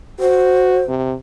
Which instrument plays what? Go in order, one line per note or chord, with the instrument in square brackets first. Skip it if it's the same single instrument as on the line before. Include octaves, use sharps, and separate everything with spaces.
[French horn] F#4 [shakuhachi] C5
[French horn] C3